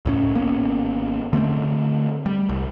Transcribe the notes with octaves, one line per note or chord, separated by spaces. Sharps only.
C#2 A2 C#4
G#1 A#3 B3 C#4
D3 A3 B3 C4
G3
C2